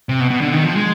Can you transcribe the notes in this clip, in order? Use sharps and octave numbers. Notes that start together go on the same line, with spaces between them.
C3
B2
B2
D3
D#3
F3
G#3